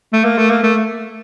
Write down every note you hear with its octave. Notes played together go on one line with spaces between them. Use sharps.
A3
A#3
A3
A#3
A3